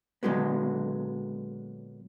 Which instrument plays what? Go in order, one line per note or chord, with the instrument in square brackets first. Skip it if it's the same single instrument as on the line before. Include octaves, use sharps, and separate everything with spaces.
[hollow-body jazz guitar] A#2 D3 F#3 G#3 B3